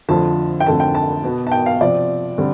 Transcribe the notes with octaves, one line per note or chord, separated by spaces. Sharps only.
F2 D3 F3 A3 A5
G5
F2 D3 A3 C4 A5
G5
A5
B2 B3
A5
G5
F5
C3 F3 C4 D5
D3 G3 C4